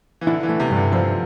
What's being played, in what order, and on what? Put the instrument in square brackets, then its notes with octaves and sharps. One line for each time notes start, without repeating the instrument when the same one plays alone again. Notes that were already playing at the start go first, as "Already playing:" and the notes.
[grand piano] E3
[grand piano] D3 [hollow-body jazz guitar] E4
[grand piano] E3
[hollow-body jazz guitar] A3
[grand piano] C3
[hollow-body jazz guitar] G2 [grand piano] E3
[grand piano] D3
[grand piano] D3 [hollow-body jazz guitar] F3